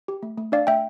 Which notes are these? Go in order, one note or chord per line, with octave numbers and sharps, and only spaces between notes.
G4
A3
A3
D4 D5 F5
A3 E5 G5